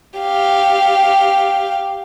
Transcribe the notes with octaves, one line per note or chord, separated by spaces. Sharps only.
G4 F5